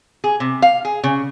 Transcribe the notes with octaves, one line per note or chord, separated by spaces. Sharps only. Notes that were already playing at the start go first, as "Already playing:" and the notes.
G#4
C3
F5
G#4
C#3